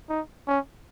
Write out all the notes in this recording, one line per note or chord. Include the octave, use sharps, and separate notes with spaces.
D#4
C#4